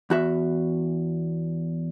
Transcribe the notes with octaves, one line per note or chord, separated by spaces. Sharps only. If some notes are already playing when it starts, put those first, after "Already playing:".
E2 F#4 E5